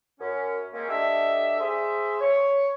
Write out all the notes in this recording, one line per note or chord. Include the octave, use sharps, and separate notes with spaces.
F#2 C#4
G#3 A#3 C4 C#4
D4 G4 A4 D#5 E5
G#4 C5 E5
C#5